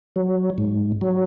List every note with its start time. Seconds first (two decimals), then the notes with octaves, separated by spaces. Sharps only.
0.16 F#3
0.58 G#2
1.01 F#3